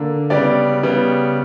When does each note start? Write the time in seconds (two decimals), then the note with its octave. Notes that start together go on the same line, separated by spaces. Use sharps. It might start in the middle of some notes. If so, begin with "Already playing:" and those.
Already playing: D3 A#3 D4
0.30 C#3 G3 B3 D5
0.83 C#3 G3 B3